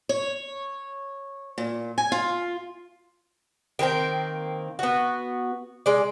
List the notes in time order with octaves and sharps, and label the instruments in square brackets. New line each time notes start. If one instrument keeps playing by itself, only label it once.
[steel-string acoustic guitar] C#5
A#2
G#5
F4
[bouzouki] D#3 A#3 C4 G5
B3 F#4
G#3 D5